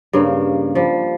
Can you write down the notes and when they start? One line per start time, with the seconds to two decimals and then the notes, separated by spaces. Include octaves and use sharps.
0.13 G2 C#3 A#3
0.75 F3 G3